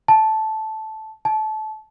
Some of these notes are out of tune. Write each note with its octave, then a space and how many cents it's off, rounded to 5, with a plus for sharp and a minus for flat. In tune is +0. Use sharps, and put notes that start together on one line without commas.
A5 -10
A5 -25